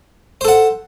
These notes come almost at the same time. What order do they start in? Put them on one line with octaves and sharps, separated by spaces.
C5 A4 F#5